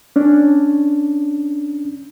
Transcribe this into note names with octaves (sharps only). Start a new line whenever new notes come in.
C#4 D4